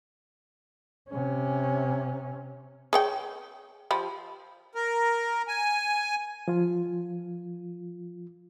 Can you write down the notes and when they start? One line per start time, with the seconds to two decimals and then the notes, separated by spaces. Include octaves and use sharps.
1.10 C3 C#4
2.93 G#4 C#5 G5
3.91 F3 G4 B5
4.75 A#4
5.48 G#5
6.48 F3 F4